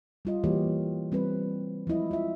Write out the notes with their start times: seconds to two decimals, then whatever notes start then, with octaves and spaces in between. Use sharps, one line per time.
0.25 G3 F4 D#5
0.44 E3 G3 A#3 F#4 G4 C#5
1.12 G3 C4 F4 B4
1.87 F3 G#3 E4 D#5
2.11 F4 E5